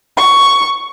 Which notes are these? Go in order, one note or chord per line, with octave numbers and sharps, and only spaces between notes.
C#6